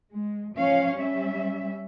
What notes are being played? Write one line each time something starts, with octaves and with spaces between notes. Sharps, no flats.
G#3
F3 C#4 C#5 F5
G3 C#4 E5